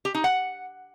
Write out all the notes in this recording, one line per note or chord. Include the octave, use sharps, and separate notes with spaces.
G4
D#4
F#5